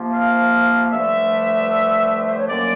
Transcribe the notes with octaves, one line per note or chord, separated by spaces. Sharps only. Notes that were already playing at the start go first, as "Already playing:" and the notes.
Already playing: C3 F3 A#3
F5
G2 D3 F3 A3 E5
C5
C#5
F#2 D3 F#3 A#3 D5